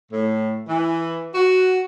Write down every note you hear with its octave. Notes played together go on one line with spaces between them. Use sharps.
A2
E3
F#4